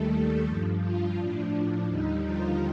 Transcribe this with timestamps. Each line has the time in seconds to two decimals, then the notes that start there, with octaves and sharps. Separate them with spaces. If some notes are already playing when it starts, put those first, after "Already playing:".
Already playing: D#2 D#3 G3 A3 A4
0.43 G2 F3
0.79 F3 F4
1.15 A2 F3 D4
1.87 D#2 D3 G3 D#4
2.23 F3 F4